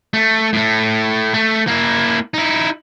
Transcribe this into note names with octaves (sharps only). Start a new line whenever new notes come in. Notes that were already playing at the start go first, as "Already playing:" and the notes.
A3
A2 A3
A3
A#3 E4
D#4 E4